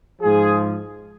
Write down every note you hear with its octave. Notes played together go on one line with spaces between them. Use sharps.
G#2 F3 G#4